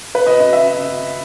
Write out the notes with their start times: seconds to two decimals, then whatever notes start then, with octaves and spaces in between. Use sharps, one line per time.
0.15 B4
0.27 D#5
0.41 D#5
0.53 E5